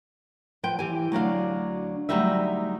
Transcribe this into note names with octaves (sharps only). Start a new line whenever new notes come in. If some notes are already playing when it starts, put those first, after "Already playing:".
F3 B4 G5
E3 G4 G#5
D2 F#3 D4 F5
D2 G#2 F#3 G3 D#4 E5